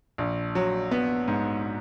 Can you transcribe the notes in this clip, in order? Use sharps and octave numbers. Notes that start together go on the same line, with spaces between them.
A#1
F#3
B3
G#2